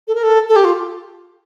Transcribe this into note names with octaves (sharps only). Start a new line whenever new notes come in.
A4
A#4
A4
A4
G4
F4